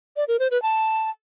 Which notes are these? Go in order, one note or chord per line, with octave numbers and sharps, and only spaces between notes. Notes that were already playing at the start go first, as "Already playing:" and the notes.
D5
A#4
C5
B4
A5